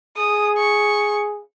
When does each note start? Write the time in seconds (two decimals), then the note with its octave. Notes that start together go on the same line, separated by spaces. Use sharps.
0.17 G#4 D#6
0.58 C#6